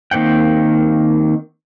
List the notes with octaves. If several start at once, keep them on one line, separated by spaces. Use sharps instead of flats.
D#3 A#3 C4 F#5 G5